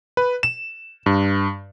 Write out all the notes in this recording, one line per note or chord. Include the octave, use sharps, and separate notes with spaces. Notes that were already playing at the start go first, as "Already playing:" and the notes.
B4
E7
G2